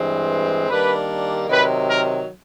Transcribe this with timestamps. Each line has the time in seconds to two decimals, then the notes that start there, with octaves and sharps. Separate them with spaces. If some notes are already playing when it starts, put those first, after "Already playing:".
Already playing: G2 E3 G#3 C4
0.68 D#3 G3 A#3 D4 B4
1.49 C3 D#3 F#3 B4
1.89 A#4